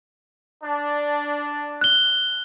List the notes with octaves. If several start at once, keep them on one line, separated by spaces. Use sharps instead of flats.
D4
F#6 G7